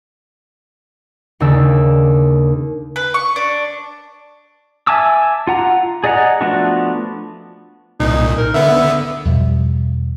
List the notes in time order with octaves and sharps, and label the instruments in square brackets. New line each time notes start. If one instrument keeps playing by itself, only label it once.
[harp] D#2 C#3 A#3 D4 E6
[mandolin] B4
C#6
D4
[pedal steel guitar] E5 G#5 A5 D6 E6
F4 F#5 A#5
G#4 D5 D#5 F#5 A#5
F3 A3 B3 D4 F#4
[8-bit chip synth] C2 A#2 [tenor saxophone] D#4
[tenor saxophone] A#4
[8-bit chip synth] D3 B3 [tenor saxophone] E5
[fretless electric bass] E2 B2 F3 G3